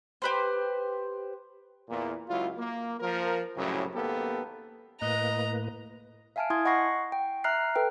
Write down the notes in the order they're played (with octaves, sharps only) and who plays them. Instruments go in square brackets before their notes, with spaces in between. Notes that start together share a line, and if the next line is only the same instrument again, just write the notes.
[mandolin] G4 B4 C5
[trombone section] E2 A#2
C#2 F#3 E4 F4
A#3
F3 A#4
C2 F#2 A2 C#3 F#3
G#1 A#3 B3 G4 A4
[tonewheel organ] A2 A#3 B4 [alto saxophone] D#5 [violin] A#5
[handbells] E5 F5 G#5 A5 F6 D7
E4 G#5 C6 D#6 G#6
D#5 F#5 B5 C#6 A#6 C7
G5
E5 A#5 F6 F#6 C7
A4 B4 G5